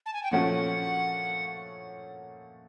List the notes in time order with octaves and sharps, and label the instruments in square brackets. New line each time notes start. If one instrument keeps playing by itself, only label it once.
[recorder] A5
G#5
G5
[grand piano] A#2 F3 A3 C#4 F#4 [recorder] F#5